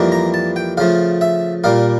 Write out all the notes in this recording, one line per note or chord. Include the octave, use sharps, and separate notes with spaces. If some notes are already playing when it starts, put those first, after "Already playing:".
Already playing: F2 E3 G3 A#3
A#5
A5
G5
C#3 F3 A3 F5
E5
A#2 G3 A#3 F5